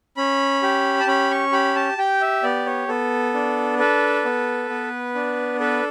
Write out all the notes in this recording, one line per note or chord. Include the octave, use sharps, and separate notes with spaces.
C#4 B5
G4
A5
C#4 B5
C#6
G4 B5
A5
G4 G5
E5
B3 D5
C#5
B3 A4
D4
A4 B4
B3
B3
D4
A4 B4